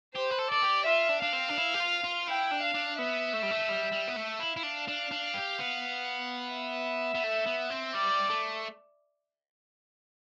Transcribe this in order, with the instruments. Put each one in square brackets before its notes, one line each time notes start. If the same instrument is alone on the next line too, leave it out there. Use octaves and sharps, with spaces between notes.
[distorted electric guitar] G4 [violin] C5
[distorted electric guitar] B4
A4
[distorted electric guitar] A4 [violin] D5
[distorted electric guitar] G4
[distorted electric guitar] F4 [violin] E5
[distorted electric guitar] D4
[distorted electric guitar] D4 [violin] F5
[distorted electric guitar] C4
D4
E4
G4
F4
F4
[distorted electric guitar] E4 [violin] G5
[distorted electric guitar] D4
[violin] F5
[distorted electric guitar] D4
[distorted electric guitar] B3 [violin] E5
[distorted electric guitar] A3
G3
A3
G3
G3
B3
A3
[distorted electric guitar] E4 [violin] F5
[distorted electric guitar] E4
D4
D4
D4
G4
B3
[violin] E5
[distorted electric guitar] B3
A3
B3
C4
[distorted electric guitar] G3 [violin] D5
[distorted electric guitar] A3